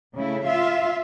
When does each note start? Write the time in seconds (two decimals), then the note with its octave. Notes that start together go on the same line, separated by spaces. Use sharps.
0.15 C#3 A3 E4
0.45 F4 E5 F5